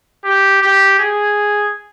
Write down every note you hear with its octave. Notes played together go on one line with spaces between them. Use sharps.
G4
G4
G#4